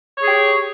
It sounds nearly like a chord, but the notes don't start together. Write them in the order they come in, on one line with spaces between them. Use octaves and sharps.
C#5 G#4 G4